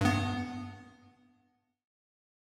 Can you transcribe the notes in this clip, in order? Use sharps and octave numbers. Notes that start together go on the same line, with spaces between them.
G2 B3